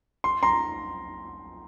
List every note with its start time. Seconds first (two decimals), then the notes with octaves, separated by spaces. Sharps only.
0.24 C6
0.43 A#5 C6